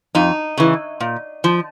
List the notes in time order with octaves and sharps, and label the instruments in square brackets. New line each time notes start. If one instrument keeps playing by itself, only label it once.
[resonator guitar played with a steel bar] F2 D#4
C#3 E3
A#2
F3